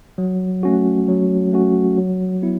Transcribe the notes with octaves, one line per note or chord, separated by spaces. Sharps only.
F#3
A3 C#4 F#4
F#3
A3 C#4 F#4
F#3
B3 E4